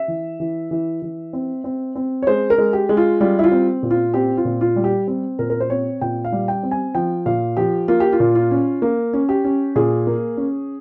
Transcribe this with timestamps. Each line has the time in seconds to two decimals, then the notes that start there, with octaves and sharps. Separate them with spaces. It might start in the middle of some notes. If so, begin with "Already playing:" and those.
Already playing: E5
0.08 E3
0.40 E3
0.71 E3
1.02 E3
1.33 C4
1.64 C4
1.95 C4
2.22 C#5
2.27 G#3 C5
2.50 A#4
2.58 G#3
2.73 G4
2.89 G#3
2.97 F4
3.20 G3 F4
3.39 E4
3.44 F4
3.52 C4
3.83 A#2
3.91 F4
4.14 C4 G4
4.37 F4
4.45 A#2
4.61 F4
4.76 G3
4.84 G4
5.07 C4
5.39 A#2 A#4
5.50 A#4
5.60 C5
5.70 C4 C#5
6.01 A#2 G5
6.25 F5
6.32 G3
6.48 G5
6.63 C4
6.71 G#5
6.95 F3 G5
7.26 A#2 F5
7.57 F3 G4
7.88 A#3 F4
8.00 G4
8.13 F4
8.20 A#2
8.35 F4
8.51 C#4
8.82 A#3
9.13 C#4
9.29 G4
9.45 C#4
9.76 A#2 G#4
10.07 A#3
10.37 C#4